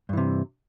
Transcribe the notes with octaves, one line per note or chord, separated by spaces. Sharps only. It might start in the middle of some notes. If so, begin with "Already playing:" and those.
G2 C3 E3